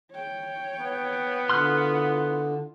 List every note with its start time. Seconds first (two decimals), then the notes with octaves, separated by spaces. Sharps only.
0.12 C#5 G5
0.80 B3
1.50 D3 E4 F4 C6 F6 F#6